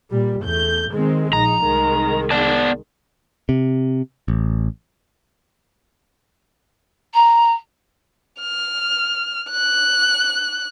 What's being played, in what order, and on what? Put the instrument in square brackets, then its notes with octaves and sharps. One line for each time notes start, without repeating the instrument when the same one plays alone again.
[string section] A#2 G3
E2 A3 G6
D#3 G#3 C4
[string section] A#1 D#4 [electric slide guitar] A#5
[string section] C2 D#3 G#3
[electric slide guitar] B3 D5 A5
[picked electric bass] C3
A1
[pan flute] A#5
[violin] F6
F#6